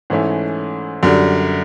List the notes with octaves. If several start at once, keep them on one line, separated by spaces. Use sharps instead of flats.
G#2 E3 A3 C#4 E4
F#2 D3 G3